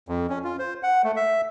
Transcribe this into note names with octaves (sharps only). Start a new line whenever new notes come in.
F2
C#4
F4
C5
F#5
A3
E5